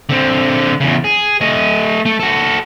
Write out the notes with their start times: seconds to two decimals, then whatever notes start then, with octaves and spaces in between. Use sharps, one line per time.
0.09 D3 C4
0.81 E2 C#3
1.04 G#4
1.41 A3 D#5
2.05 A3
2.20 F#4 A4